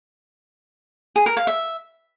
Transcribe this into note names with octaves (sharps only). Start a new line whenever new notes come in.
G#4
A#4
F5
E5